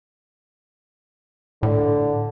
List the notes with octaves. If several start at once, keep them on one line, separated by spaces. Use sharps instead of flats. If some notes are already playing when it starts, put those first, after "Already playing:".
A2 D3